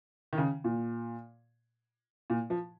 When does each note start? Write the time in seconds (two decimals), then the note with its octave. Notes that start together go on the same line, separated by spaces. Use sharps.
0.33 D#3
0.38 C#3
0.64 A#2
2.30 A#2
2.50 F3